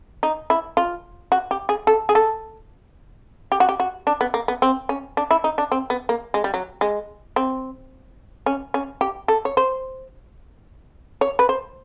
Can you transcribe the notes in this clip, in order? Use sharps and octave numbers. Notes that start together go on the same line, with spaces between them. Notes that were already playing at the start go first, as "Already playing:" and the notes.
D#4
E4
F4
F#4
G4
G#4
A4
G#4
A4
G4
F#4
G4
F#4
D4
B3
A#3
B3
C4
C#4
D4
E4
D#4
D4
C4
B3
A#3
G#3
G3
F#3
G#3
C4
C#4
C#4
G4
A4
C#5
C5
C#5
B4
C5